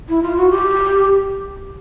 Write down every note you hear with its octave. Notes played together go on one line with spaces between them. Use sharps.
E4
F4
F#4
G4